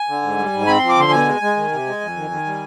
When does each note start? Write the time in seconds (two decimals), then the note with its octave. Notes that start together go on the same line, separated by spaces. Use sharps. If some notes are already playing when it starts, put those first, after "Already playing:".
Already playing: G#5
0.09 D3
0.22 G#2
0.38 G3
0.53 G#2
0.67 C4 B5
0.79 F3 C6
0.89 D6
0.97 D3 C6
1.11 B2 G#5
1.27 G#3
1.42 G#3
1.57 D#3
1.71 C3
1.86 G#3
2.01 F2
2.16 D#3
2.31 D#3
2.46 G3